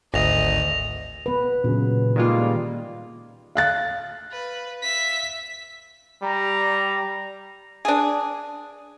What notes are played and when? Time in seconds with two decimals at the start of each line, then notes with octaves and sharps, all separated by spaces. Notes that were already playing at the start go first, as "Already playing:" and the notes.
0.14 G#1 D2 D#5 A#6 F7
1.26 B3 B4
1.64 A#2 C#3 E3 F#3 B3
2.16 D#3 G3 G#3 A#3 F4
2.40 D5
3.55 F5 F#6 A6
4.32 B4
4.82 E5 B6
6.23 G3 A#5
7.85 D4 G#4